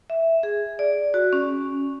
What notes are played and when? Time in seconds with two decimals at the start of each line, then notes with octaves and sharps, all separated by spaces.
0.10 E5
0.43 G#4
0.79 D5
1.14 F#4
1.33 C#4